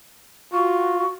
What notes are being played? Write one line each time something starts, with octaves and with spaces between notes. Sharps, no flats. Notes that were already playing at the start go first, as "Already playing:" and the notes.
F4 F#4 C#6